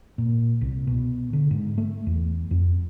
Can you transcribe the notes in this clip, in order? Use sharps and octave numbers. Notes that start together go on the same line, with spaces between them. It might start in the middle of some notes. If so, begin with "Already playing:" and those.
A#2
C2
B2
D3
G#2
A3
E2
F2